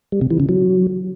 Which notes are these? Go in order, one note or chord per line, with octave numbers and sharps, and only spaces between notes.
G3
C3
E3
C#3
F#3